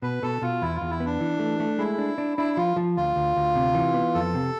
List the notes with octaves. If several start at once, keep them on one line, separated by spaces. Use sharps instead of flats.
B2 B4
B2 A4
B2 F4
E2 E4
F4
E2
E4
B3
D4
E3
A3
A3
G#3 E4
D4
D4
D4 E4
F3 F4
F3
D2 F4
D2
D2
C3
E3
B3
F2 A4
C3